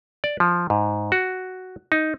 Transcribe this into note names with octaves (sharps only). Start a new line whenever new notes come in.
D5
F3
G#2
F#4
D#4